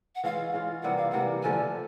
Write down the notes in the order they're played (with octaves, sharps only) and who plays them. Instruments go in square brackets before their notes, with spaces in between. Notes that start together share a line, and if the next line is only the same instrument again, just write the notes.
[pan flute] F#5
[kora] E3 G#3 C#4 F4 [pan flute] F5
[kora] E3 G#3 C#4 F4
[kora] C3 E3 G3 A#3 [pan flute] F#5
[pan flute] F5
[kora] C3 E3 G3 A#3 [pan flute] F#5
[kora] D3 F3 A3 [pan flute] G#5